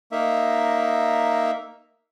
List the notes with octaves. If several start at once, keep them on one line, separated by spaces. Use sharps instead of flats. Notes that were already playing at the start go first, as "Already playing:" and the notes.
A#3 D#4 E5